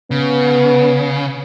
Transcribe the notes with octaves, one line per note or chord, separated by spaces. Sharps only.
C#3 B3